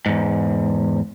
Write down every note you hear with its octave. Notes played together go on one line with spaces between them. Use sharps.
E2 G#2